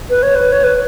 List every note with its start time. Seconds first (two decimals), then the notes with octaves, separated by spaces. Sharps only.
0.10 B4
0.23 C#5
0.36 B4
0.52 C#5
0.64 B4